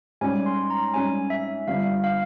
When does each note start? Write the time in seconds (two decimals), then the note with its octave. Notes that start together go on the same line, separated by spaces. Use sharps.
0.21 G#2 G3 C#4 G#5
0.46 C6
0.70 A#5
0.94 G#2 G3 C#4 G#5
1.30 E5
1.68 G1 G2 G3 F5
2.04 F5